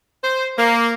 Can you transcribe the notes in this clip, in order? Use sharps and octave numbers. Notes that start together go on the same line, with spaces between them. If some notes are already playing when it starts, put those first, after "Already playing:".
C5
A#3